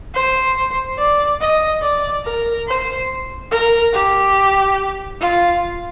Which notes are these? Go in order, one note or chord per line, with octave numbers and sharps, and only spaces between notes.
C5
D5
D#5
D5
A#4
C5
A#4
G4
F4